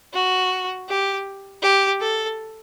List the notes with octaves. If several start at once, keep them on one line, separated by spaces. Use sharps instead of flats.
F#4
G4
G4
A4